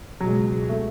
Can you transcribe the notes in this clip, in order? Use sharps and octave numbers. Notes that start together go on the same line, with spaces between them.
C#2 B2 F#3 G#3
A3